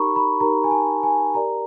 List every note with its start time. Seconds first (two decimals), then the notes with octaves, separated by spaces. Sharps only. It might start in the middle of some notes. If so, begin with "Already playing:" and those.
Already playing: D#4 G4 A#4 A#5 B5 C#6
0.16 B5
0.40 D#4 G4 A#4 A#5
0.64 G#5
0.71 A5
1.03 G#5
1.34 G4 A#4 D5 A#5